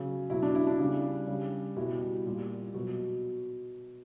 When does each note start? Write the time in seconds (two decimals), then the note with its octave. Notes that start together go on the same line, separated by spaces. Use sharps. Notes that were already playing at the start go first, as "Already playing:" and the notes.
Already playing: C#3 F#3
0.30 B2 F#3 E4
0.43 D4
0.55 E4
0.67 D4
0.80 C#3 G3
1.27 C#3 G3
1.77 B2 G3 E4
2.26 A#2 G3
2.74 B2 F#3